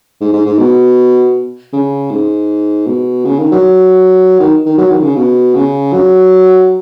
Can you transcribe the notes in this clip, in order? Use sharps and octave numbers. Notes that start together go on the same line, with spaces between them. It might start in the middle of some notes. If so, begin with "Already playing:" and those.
G#2
G#2
G#2
B2
C#3
G#2
B2
C#3
D#3
F#3
D#3
D#3
F#3
D#3
C#3
B2
C#3
F#3